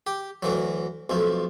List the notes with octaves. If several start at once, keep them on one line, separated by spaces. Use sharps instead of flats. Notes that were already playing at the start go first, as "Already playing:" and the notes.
G4
D2 E3 F#3
B1 F2 A3